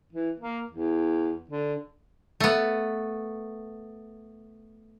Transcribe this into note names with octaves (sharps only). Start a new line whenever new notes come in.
E3
A#3
E2
D3
A3 B3